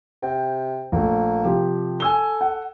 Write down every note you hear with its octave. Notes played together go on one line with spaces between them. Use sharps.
C3 G5
A#1 A3 A#3
C3 F3 G4
A4 G#5 E6 G7
F#5